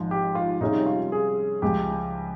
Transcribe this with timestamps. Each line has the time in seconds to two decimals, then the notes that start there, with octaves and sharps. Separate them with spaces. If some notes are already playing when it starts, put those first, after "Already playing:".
Already playing: G#1 G#2 F3
0.11 G4
0.35 F4
0.61 C3 G3 C#4 D#4 G#4
0.86 F4
1.12 G#4
1.62 C#2 C#3 F3 G4